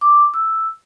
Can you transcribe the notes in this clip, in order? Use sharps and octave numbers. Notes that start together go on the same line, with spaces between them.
D6
E6